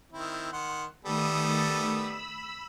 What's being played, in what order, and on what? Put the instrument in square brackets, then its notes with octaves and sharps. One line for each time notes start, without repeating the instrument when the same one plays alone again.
[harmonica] D#3 C4 E4
D#3 F#5 C6
[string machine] D#3 A3 D#6 [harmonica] G3 B3 A4
[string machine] B5 E6